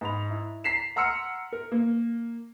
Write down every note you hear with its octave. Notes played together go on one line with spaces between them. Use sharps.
G#2 B5 F7
E4
A#5 B6 C7 E7
F#5 A#5 C6 E6 F6 C#7
A#4
A#3